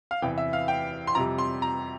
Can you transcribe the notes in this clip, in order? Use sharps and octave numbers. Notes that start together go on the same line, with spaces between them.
F5
E2 C3 E3 G5
E5
F5
G5
C6
F2 C3 G3 A#5
C6
A#5